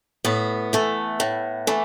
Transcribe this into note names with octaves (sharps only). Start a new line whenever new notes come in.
A2 B3
E3 A3
A2
E3 A3